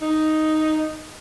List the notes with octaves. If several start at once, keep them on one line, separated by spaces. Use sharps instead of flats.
D#4